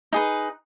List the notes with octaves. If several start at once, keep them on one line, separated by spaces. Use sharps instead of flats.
D#4 G#4 B4